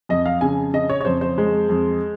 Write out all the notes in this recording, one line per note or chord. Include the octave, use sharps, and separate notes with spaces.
F2 D#5
F5
C#3 G#5
C#3 D#5
C#5
C#5
F2 C5
C5
G#3
F2